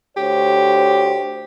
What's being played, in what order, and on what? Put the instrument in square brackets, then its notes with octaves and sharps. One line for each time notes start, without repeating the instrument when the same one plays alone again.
[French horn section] D2 C5 C#5 [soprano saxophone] G4